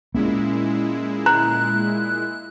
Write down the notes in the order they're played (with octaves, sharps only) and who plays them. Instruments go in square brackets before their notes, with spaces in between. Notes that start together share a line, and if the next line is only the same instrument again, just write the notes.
[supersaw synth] A#2 G#3 E4 [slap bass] A#3 C#4
[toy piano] A#5 [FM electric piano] F#6